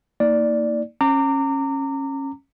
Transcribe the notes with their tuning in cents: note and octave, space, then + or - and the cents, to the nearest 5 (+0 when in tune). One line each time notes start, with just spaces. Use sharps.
A#3 -20 D#4 +30 D5 +0
C#4 -20 A#5 -30 D6 +0